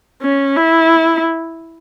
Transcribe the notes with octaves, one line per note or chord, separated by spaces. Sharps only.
C#4
E4